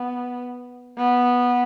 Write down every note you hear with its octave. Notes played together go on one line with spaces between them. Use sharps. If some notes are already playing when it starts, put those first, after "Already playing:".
Already playing: B3
B3